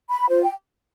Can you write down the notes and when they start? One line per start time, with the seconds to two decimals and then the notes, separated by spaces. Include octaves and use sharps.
0.10 B5
0.29 F4 C5
0.42 G5